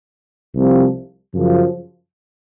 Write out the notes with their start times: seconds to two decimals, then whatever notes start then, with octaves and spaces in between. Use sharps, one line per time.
0.55 C2 C3 F3
1.34 F#2 C#3 F3